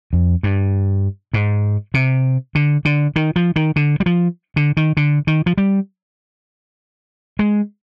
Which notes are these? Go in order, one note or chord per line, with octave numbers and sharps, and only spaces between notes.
F2
G2
G#2
C3
D3
D3
D#3
F3
D#3
D3
G3
F3
D3
D#3
D3
D#3
F3
G3
G#3